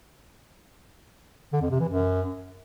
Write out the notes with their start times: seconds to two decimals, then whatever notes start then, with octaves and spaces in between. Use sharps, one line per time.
1.53 D3
1.62 F2
1.71 C3
1.80 E3
1.89 F#2